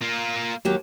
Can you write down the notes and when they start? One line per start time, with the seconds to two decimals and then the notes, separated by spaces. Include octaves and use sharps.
0.02 A#3 F4
0.65 D#2 F#3 G4